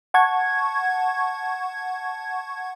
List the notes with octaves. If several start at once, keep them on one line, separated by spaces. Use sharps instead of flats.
F#5 A5 C#6 G#6